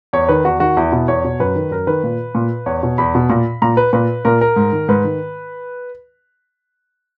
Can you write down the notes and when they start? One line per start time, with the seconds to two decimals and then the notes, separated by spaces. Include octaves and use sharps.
0.13 E2 C#5
0.29 D#3 B4
0.45 E2 F#4
0.60 D#3 F#4
0.77 E2 E4
0.92 B2
1.08 E2 C#5
1.25 B2
1.40 F#2 B4
1.55 D#3
1.71 F#2 A#4
1.87 D#3 B4
2.04 A#2
2.35 A#2
2.66 E2 C#5
2.83 B2
2.98 E2 B5
3.15 B2
3.30 A#2
3.62 A#2 A#5
3.77 B4
3.93 A#2 B4
4.25 A#2 A#4
4.41 A#4
4.56 G#2
4.72 D#3
4.88 G#2 B4
5.04 D#3